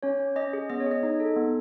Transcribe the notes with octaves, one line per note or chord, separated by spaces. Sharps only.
C#4 C#5
C#4
C#4 D#5
G#4
B3 D#5
C#5
G#4 D#5
D#4
A4
B3